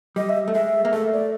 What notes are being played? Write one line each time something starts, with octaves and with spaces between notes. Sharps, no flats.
G3 D#5
E5
A3
G#3 E5
A#3
A3 E5
D5